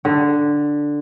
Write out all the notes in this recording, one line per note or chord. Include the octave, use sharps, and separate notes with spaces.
D3